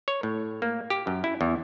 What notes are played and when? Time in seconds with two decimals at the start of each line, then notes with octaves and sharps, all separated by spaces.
0.08 C#5
0.23 A2
0.62 A#3
0.90 G4
1.07 F#2
1.24 E4
1.41 E2